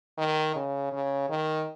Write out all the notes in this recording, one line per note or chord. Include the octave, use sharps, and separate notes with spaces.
D#3
C#3
C#3
D#3